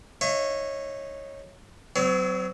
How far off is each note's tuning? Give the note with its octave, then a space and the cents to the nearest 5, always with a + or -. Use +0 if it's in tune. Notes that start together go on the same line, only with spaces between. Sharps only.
D#4 +0 C#5 -10 E5 +35
F#3 +20 C4 -35 C#5 +30